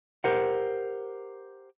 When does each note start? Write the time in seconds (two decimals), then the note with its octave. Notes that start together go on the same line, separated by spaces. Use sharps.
0.24 G4 A#4 C5 F#5